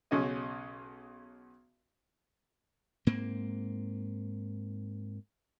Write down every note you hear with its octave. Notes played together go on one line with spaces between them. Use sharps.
B1 C#3 C#4 F#4 D#5
G#2 A#3 C4